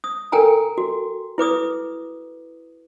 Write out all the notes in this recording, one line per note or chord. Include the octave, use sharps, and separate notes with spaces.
D#6
A4 A#4 G5 G#5 A#5
F#4
E4 B4 D6 D#6